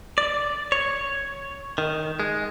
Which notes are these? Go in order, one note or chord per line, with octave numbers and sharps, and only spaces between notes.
D5
C#5
D#3
G#3